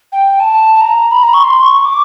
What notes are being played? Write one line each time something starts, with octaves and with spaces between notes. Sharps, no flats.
G5
A5
A5
A#5
B5
A#5
C#6
C6
C#6
D6